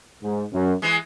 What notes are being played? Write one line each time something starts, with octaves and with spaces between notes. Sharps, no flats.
G#2
F#2
E3 G#3